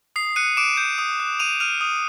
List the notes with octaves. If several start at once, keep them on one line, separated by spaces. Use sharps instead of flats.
D#6 C7
F#6 C#7 D#7
D6 D7 E7
G6
D#6
F#6
D6 D#7 F7
F6 D#7 F7
D#6